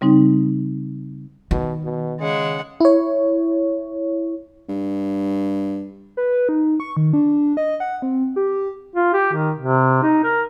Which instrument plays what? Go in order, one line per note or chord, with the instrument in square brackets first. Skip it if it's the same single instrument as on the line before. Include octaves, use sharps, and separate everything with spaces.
[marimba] C#3 G3 C4 D#4
[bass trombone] B2 [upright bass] D#3
[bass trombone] B2
[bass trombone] C#3 [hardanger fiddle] G#3 F#5
[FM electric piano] E4 C#5
[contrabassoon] G2
[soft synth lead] B4
D#4
C#6
D#3
D4
D#5
F#5
C4
G4
[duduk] F4
G4
D#3
C3
D#4
A#4